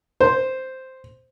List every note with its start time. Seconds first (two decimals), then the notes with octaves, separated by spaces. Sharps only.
0.21 C5